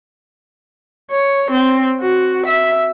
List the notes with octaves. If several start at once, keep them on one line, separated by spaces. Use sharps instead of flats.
C#5
C4
F#4
E5